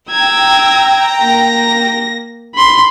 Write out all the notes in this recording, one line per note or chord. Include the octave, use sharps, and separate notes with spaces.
G5 A#5 E6 G#6
A#3 A#6
B5 C6